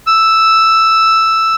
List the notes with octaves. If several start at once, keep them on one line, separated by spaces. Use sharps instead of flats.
E6